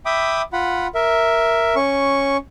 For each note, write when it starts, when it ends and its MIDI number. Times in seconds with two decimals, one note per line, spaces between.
0.06 0.42 76
0.06 0.42 79
0.06 0.42 83
0.06 0.42 86
0.06 0.42 87
0.53 0.87 65
0.53 0.87 78
0.53 0.87 83
0.95 1.75 70
0.95 1.75 76
1.76 2.37 61
1.76 2.37 85